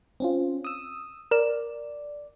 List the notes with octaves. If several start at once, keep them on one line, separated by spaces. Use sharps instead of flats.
C4 C#4 F4
D#6 E6
A#4 D5 E7